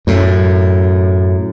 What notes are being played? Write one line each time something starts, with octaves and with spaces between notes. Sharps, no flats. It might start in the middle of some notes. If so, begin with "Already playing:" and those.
F#2 A2